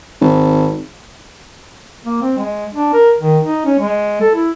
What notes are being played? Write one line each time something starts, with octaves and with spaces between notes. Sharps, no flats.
G#1
A#3
C4
G#3
D4
A#4
D#3
D#4
C#4
G#3
A4
E4